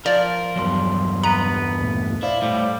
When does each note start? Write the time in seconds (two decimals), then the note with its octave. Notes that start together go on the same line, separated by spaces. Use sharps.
0.06 F3 A#4 D5
0.55 E2 G2 F#3 C6
1.23 B3 B4 A#5
1.80 D#2 A#2 A3
2.23 E4 C5 D5 F5
2.42 A2 G3